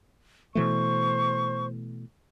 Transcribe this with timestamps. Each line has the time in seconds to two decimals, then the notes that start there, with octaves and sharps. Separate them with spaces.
0.55 B2 E3 A3 C5 C#6